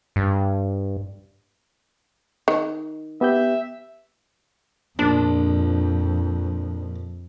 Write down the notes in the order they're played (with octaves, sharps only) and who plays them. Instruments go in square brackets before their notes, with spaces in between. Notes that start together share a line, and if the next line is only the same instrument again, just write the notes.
[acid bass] G2
[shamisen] D#3
[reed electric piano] B3 G4 G6 [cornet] E5
[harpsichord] A#1 [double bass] F2 [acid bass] D4